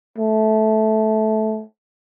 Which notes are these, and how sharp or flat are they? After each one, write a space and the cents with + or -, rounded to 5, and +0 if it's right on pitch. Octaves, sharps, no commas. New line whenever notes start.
A3 -15